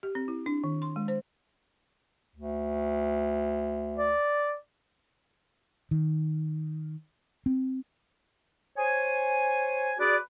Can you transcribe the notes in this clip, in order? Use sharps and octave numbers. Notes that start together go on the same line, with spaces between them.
G4
C4
E4
D4
D#3
C6
G#3
C5
D2
D5
D#3
C4
C5 C#5 G#5
F#4 G#4 B4 D5